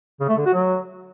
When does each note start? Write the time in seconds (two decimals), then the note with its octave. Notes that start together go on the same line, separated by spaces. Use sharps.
0.20 C#3
0.29 A3
0.37 D3
0.46 F#4
0.54 F#3